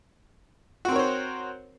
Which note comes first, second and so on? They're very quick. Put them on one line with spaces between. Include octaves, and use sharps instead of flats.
F#4 C4 A#4 C#5 C5